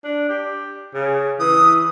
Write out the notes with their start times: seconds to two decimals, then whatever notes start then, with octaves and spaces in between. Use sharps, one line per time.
0.04 D4
0.29 G4
0.95 C#3
1.40 E3 D#6